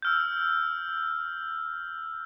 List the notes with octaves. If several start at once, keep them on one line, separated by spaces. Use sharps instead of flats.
E6 F6 G6